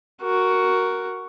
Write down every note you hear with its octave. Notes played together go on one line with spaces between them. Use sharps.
F#4 A#4